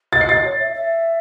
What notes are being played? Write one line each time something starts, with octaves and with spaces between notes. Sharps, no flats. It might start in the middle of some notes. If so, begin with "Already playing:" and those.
D#5 A6
C7
D#5 A6
C#5
E5
E5